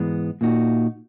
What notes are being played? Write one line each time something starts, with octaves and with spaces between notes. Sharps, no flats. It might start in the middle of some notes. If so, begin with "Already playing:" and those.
Already playing: G#2 E3 G#3 B3
A#2 A#3 D#4 F#4